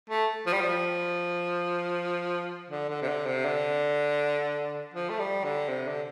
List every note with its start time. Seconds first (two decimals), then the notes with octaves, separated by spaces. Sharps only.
0.09 A3
0.46 F3
0.53 G3
0.61 F3
2.70 D3
2.89 D3
3.02 C3
3.08 D3
3.26 C3
3.45 D3
4.94 F3
5.09 A3
5.19 G3
5.44 D3
5.69 C3
5.88 D3